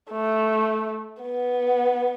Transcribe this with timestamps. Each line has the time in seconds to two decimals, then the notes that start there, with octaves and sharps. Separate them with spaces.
0.11 A3
1.22 B3